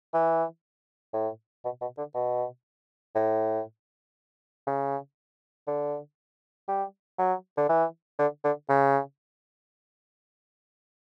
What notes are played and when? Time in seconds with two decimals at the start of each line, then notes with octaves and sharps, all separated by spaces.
0.14 E3
1.14 A2
1.65 B2
1.81 B2
1.98 D3
2.15 B2
3.15 A2
4.67 C#3
5.67 D3
6.68 G3
7.18 F#3
7.57 D3
7.69 E3
8.19 D3
8.44 D3
8.69 C#3